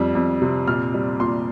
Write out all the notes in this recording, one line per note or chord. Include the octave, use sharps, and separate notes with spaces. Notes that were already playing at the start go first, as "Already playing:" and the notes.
Already playing: F2 G3
F2
C3
A#2 F6
G3
A#2 C6